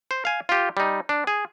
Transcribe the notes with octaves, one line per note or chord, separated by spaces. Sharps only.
C5
F5 G#5
F4 G4
G3 D#4
D4
G#4